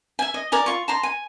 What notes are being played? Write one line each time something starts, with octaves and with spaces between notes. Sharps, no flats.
E5 G#5
D#5
A#4 D5 G#5
F4 C#6
A5 A#5 C6
G#5